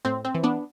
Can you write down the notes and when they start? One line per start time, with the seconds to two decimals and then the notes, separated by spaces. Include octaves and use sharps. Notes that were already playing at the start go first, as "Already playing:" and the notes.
0.05 A2 C4
0.25 C4
0.34 E3
0.43 B3 D4